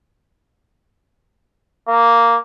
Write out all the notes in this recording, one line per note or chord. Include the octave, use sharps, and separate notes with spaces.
A#3